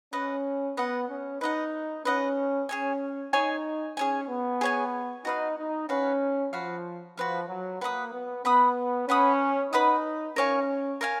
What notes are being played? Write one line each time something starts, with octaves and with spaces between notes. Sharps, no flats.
C#4 B4 D#5 F#5
B3 B4 D#5 F#5
C#4
D#4 B4 D#5 F#5
C#4 B4 D#5 F#5
C#4 G#4 C#5 G#5
D#4 G#4 C#5 G#5
C#4 G#4 C#5 G#5
B3
G#4 C#5 G#5
D#4 F#4 B4 F5
D#4
C#4 F#4 B4 F5
F3 F#4 B4 F5
F3 F#4 B4 F5
F#3
A#3 B4 F#5 B5 D#6
B3
B3 B4 F#5 B5 D#6
C#4 B4 F#5 B5 D#6
D#4 B4 F#5 B5 D#6
C#4 A#4 C#5 F5 G#5
A#4 C#5 F5 G#5